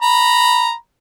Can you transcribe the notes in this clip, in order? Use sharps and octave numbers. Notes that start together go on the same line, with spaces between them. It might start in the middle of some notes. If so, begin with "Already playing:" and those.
A#5 B5